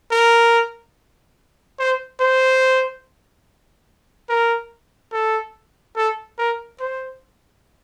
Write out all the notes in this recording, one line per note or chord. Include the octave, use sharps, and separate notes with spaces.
A#4
C5
C5
A#4
A4
A4
A#4
C5